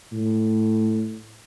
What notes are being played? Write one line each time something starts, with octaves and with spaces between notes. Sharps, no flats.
A2